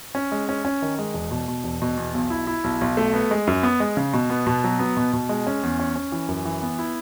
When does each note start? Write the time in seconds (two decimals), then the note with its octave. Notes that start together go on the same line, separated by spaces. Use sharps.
0.15 C#4
0.32 G#3
0.49 C#4
0.65 C#4
0.82 D#3
0.99 G#3
1.14 E1
1.31 B2
1.48 B2
1.64 E1
1.82 B2
1.97 E2
2.14 B1
2.30 E4
2.47 E4
2.64 B1
2.81 B1
2.97 A3
3.14 B3
3.31 G#3
3.47 F#2
3.63 B3
3.80 G#3
3.97 C#3
4.14 B2
4.30 B3
4.47 B2
4.64 F#3
4.79 B3
4.97 B2
5.13 B2
5.29 G#3
5.47 C#4
5.63 E2
5.80 C#4
5.96 C#4
6.12 E3
6.29 F#2
6.45 E3
6.63 B3
6.78 E4